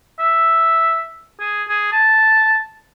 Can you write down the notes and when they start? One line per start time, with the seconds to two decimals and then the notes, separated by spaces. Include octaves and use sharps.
0.19 E5
1.40 G#4
1.69 G#4
1.92 A5